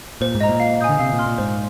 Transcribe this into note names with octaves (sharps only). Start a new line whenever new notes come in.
A#2 C5
G#2
D#5 A#5
A#2
F5
G#5 D#6 G6
D3
C3 F5
A#2
C6 F6
A#2
G#2 C5